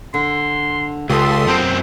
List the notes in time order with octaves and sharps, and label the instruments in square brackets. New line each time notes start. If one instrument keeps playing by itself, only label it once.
[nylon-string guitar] D3 [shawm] C6
[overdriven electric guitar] C#2 [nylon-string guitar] F4 G4 [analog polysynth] A4 C6 D#6 [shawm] E5
[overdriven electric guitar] F#2 C4